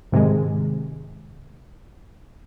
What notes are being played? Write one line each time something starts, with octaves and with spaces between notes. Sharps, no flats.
G#2 C3 D#3 G#3